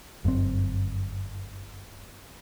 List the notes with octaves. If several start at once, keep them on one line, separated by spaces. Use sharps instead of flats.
G1 F#2 A#2 C4